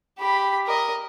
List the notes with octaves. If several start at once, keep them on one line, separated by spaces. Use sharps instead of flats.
G4 B5
A#4 D#5